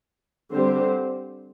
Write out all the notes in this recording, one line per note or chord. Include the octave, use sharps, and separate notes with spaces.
D3 G3 C4 G4 C5